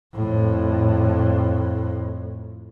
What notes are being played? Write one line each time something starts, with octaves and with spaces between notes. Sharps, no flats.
F2 A2